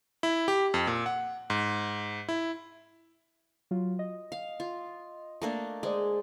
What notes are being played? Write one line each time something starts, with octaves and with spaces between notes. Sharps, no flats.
E4
G4
F2
A#2
F#5
G#2
E4
F#3 F4
D#5
F5
F4
A3 A#3 D4
G#3 G#4 C5 D5